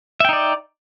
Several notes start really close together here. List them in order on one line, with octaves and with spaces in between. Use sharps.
E5 G5 D#4 D5